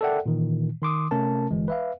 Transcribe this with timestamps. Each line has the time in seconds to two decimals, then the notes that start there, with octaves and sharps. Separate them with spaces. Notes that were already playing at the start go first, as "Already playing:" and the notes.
0.01 A4 A#4 D5 E5 F#5 G5
0.26 A#2 D#3 E3
0.82 D#3 C6 D6 D#6
1.11 C3 A3 C#4 A#4 A5
1.51 G1 E3 G#3
1.68 B4 E5 F5